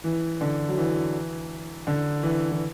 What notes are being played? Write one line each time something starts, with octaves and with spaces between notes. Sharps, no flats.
E3
D3
F#3
E3
D3
E3
E3